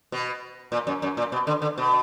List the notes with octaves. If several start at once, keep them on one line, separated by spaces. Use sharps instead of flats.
B2
A#2
F#2
F#2
A#2
B2
D3
D3
B2